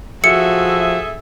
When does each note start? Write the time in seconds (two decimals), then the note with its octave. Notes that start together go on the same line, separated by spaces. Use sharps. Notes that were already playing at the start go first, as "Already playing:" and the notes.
0.24 F3 F#4 G#4 A4 E5 C#7